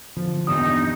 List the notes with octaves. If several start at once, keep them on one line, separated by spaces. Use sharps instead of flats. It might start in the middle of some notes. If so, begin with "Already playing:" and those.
D3 E3 F3
A#1 E2 G2 D#4 D#6